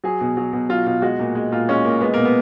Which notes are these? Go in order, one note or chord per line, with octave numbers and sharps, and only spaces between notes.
F#3 G#4
B2
F#3
B2
F#3 F4
B2 F4
G#3 F#4
A#2
G#3
A#2 F4
G#3 C#4
A#2 A#3
G#3 B3
B2 A#3
B3